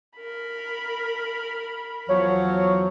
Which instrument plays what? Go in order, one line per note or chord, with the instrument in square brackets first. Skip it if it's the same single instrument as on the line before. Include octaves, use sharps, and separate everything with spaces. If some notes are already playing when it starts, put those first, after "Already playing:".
[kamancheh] A#4 B5
[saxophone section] E2 F3 F#3 [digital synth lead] C#5